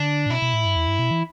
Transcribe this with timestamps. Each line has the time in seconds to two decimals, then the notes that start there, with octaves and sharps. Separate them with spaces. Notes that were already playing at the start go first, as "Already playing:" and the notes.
Already playing: D3 D4
0.26 A2
0.30 B2 E4
0.42 B2
0.53 A2
0.65 G2
0.76 E2
0.88 G2
0.99 B2
1.11 E3